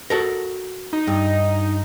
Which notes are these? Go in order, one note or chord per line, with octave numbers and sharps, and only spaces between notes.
F#4 A4 A#4
D#4
G2